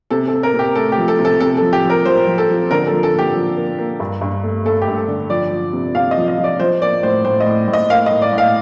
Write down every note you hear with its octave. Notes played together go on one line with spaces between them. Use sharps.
C3 A4
A4
C3
A#4
C3
G4
A3 A4
G4
F3
A4
C3
A4
C3 A4
A4
F3
G4
F3
A#4
F3 C5
F3
A4
F3
D3 A#4
A4
F3
A4
A#3 G4
F3
A#3
A#3
G2
G2
A3
A3 A4
G4
G2
A4
D3
F3 D5
F3
C3
C3 F5
D#5
F3
D#5
F3
D5
F3 C5
A#3 D5
A2 C5
A2 C5
D#5
A2
A2
D#5
A#3 F5
D#5
A2
D5
A2
F5